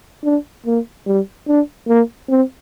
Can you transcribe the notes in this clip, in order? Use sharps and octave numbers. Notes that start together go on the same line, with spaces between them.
D4
A#3
G3
D4
A#3
C4